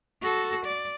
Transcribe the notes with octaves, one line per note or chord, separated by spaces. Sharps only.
F#4 A4
D5